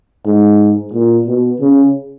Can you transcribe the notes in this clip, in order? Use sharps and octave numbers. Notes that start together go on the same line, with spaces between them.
G#2
A#2
B2
C#3